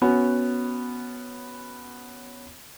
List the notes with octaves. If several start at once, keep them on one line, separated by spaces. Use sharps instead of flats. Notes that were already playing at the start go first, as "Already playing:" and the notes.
B3 C#4 F#4